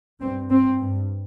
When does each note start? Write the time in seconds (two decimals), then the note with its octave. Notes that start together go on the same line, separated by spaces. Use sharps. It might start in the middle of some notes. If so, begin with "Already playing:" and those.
0.21 G2 C4
0.50 C4
0.78 G2